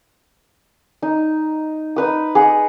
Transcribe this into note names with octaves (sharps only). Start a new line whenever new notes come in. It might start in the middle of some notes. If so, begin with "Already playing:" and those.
D#4
D#4 B4 D#6
G#4 D#5 F#5